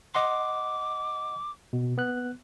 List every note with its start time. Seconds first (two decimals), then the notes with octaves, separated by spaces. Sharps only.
0.15 D#5 F#5 C6 D6
1.73 B2
1.98 B3 F#6